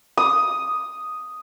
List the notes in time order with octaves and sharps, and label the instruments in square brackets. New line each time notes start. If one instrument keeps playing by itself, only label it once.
[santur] D#6